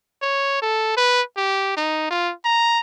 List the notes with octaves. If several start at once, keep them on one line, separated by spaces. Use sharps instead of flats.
C#5
A4
B4
G4
D#4
F4
A#5